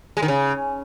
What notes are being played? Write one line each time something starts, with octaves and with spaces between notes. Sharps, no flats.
G#3
D#3
C#3